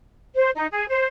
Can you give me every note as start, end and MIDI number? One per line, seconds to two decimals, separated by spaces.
0.35 0.50 72
0.55 0.67 63
0.71 0.84 68
0.88 1.07 72